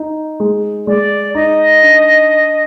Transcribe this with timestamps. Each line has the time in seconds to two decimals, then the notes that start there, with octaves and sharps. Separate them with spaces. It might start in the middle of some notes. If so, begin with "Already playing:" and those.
Already playing: D#4
0.40 G#3
0.87 G#3 D5
1.35 D#4 D#5
1.82 D4